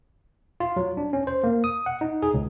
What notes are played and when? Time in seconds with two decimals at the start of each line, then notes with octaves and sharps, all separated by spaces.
0.60 F4
0.76 F#3
0.97 D4
1.13 C#4
1.27 C5
1.44 A#3
1.64 D#6
1.86 F#5
2.01 D#4
2.22 G#4
2.34 C#2